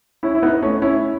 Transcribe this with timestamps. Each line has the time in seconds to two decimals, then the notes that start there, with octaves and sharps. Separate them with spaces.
0.23 C#4 E4
0.35 E4
0.43 B3 D#4
0.62 A3 C#4
0.82 C#4 E4